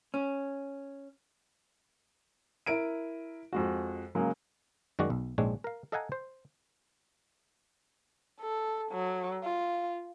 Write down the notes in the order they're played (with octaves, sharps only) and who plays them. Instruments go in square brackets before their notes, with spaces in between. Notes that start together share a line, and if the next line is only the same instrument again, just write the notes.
[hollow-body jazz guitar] C#4
[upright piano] E4 A#4 D7 D#7
F2 G#3 F#4
C#3 F#3 G#3 A#3
[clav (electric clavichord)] F#2 D#3 G#3 F#4 D5
B1
A#1 G#2 G#3 C4 D4 C#5
A#4 F5
A4 D#5 F5 F#5 G#5 A#5
C5
[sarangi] A4
F#3
F4